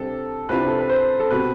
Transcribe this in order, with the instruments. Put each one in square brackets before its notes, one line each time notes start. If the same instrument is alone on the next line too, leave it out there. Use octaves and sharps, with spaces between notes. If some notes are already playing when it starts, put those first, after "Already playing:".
Already playing: [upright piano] C2 C3 G3 D4 [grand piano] A4
[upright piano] C2 C3 G3 D4 F4 [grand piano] B4
[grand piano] A4
B4
C5
A4
[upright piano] B2 G3 C4 [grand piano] B4